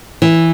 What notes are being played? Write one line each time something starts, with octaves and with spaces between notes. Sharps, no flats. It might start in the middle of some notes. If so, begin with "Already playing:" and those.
E3